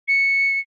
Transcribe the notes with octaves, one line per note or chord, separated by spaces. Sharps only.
C#7